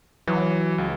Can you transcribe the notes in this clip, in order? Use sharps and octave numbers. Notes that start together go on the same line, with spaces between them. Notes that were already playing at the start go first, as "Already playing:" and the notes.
E3 F#3
C#2